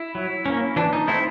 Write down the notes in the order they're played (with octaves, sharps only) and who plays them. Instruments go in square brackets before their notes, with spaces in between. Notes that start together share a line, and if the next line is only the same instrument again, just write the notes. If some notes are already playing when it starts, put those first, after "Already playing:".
Already playing: [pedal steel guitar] E4
F#3
A#3 C#4
E3 D4
D#4
A3 C4 E4